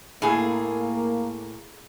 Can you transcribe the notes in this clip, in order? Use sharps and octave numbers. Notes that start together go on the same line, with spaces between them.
A2 A#3 G#4